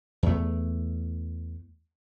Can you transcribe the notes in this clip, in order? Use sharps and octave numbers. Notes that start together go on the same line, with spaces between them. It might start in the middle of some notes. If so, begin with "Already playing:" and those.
E2 A3